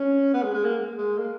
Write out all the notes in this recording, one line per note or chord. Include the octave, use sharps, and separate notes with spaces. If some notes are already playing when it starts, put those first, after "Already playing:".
Already playing: C#4
B3
G#3
G#3
A#3
G#3
A#3